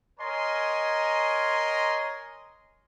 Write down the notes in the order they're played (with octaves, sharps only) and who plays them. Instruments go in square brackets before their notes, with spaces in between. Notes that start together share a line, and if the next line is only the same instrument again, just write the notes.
[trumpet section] A#4 C#5 D#5 G#5 A#5 C6